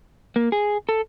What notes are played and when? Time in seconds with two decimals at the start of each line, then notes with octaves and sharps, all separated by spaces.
0.36 A#3
0.52 G#4
0.89 A4